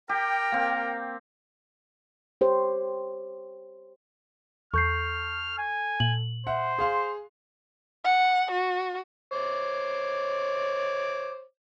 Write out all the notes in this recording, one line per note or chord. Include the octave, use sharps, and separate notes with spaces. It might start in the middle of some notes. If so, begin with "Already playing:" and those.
G4 A#4 G5
A#3 C4
G4 C5 C#5
E2 A4 C#6 F6 G6 C7
G#5
A#2 F#7
C5 E5 F#5
G#4 F5 C6
F#5
F#4
C5 C#5 D6